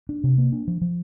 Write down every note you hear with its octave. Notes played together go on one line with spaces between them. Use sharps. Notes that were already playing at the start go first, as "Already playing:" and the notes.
D4
C3
A#3
D4
F3
F3